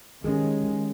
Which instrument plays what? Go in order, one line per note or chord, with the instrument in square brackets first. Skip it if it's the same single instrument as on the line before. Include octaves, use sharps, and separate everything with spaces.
[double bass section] D#3 G#3 [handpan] C#4 G4 G#4